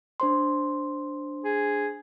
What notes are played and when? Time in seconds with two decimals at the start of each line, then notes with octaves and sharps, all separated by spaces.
0.20 D4 C5 C6
1.44 G#4